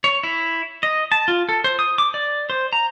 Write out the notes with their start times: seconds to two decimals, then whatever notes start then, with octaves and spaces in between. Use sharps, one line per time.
0.04 C#5
0.23 E4
0.83 D#5
1.12 A5
1.28 F4
1.49 A4
1.64 C5
1.79 D#6
1.98 D6
2.14 D5
2.50 C5
2.73 A#5